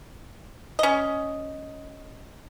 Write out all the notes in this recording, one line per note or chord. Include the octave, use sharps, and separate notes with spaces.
C#4 D#5